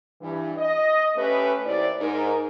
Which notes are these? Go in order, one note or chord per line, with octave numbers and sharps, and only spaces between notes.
G2 E3
D#5
A3 C#4 G4 B4
D#2 E4 G4 C5 D5
G#2 D#4 A#4